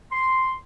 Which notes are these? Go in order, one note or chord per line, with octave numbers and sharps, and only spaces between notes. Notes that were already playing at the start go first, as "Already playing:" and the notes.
C6